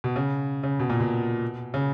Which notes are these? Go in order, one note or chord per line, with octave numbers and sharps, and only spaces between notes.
B2
C#3
C#3
B2
A#2
B2
C#3